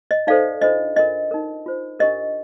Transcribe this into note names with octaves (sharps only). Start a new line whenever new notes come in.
D#5
D#4 A4 C5 D5 F5
D4 F4 A4 C5 D#5
D4 F4 A#4 D#5
D#4 A#4
F4 C5
D4 G4 A#4 D#5